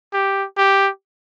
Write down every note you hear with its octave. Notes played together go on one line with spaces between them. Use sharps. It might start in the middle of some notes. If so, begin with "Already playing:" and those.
G4
G4